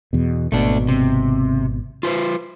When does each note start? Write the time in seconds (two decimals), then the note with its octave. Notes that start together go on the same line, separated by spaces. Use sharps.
0.13 E2 B2
0.52 G#1 B2 A3 D4
0.88 C3
2.03 F4 B4 C5